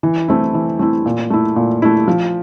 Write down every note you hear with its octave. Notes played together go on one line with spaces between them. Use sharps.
E3
A3 C4 E4
E3
A3 C4 E4
A#2
A3 E4
A#2
A3 E4
F3